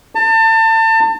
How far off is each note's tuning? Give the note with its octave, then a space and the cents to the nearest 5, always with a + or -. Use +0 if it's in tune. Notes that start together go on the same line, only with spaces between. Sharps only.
A5 +30